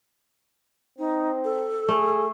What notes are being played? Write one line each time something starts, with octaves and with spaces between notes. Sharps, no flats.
C4 D#4
A4
A3 G#4